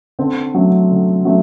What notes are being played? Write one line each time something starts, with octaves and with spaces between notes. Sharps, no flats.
D3 C4
F#3 A3
D3
F#3 A3